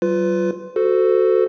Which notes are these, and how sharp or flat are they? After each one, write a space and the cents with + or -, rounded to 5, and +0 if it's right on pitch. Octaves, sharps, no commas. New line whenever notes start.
F#3 +45 F4 +0 B4 +25
F#4 +0 A4 +0 C5 -30